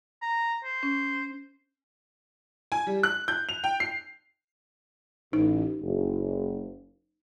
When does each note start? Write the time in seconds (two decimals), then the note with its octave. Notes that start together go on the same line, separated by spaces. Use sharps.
0.22 A#5
0.64 C5
0.83 C#4
2.72 G#5
2.87 G3
3.03 F#6
3.28 G6
3.49 F7
3.64 G5
3.80 C7
5.33 A1 D#4
5.82 F#1